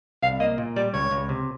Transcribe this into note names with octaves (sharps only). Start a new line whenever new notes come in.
C2 F5
A#3 D#5
A#2
G3 D5
C#2 C#5
C#2
C3